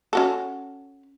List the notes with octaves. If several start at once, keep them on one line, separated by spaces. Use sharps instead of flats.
C#4 F#4 A4